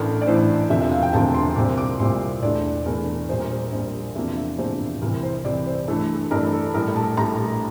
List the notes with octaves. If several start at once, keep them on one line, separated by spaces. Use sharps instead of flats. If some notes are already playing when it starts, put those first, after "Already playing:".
Already playing: A1 A2 E3 A3 D4 A#4
D5
A1 A2 E3 A3 D4 C5
E1 D2 C3 F3 E5
E5
F5
G5
E1 D2 C3 F3 A5
C6
C2 A#2 G3 C4 D6
D6
C2 A#2 G3 C4 C6
E1 E2 E3 A3 D4 D5
E1 E2 E3 A3 D4 A#4
A#1 A#2 G3 C5
A#4
C5
A#1 A#2 G3 C5
E2 C3 F3 A#3 D4 E5
E5
E2 C3 F3 A#3 D4 C5
C2 C3 E3 A#4
C5
C2 C3 E3 D5
C5
G2 E3 A3 D4 A4
G2 E3 A3 D4 A#4
A4
A#1 A2 G3 A#4
A5
A#1 A2 G3 A#5